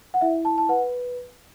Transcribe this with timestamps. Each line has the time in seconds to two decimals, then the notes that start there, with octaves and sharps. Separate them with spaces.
0.14 F#5
0.21 E4 E5
0.45 A5
0.58 A5
0.69 B4 F#5